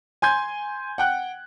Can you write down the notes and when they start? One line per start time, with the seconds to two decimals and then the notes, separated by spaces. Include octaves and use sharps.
0.22 G#5 C6 G6 G#6
0.98 F#5 G5 F#6